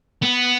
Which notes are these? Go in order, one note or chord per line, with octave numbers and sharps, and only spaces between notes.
B3